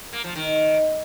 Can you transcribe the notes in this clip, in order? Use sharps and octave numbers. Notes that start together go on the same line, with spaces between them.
A#3
F3
D#3